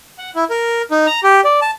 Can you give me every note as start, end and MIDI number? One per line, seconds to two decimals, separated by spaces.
0.18 0.30 78
0.35 0.44 64
0.50 0.82 70
0.91 1.06 63
1.06 1.20 82
1.23 1.41 67
1.44 1.60 74
1.62 1.71 81